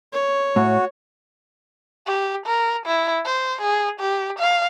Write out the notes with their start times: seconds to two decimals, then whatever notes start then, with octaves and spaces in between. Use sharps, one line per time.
0.13 C#5
0.56 A2 F#4
2.07 G4
2.46 A#4
2.86 E4
3.25 C5
3.61 G#4
4.00 G4
4.39 F5